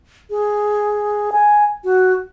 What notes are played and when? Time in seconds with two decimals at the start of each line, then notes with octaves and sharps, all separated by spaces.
0.30 G#4
1.32 G#5
1.84 F#4